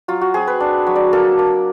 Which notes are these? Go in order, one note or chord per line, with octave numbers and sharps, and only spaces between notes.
F#3 F4
F#4
C4 G#4
B4
D4
F#3
D5
A#3 A4
A#3